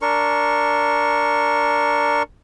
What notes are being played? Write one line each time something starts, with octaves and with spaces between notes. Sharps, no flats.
D4 A#4 C#6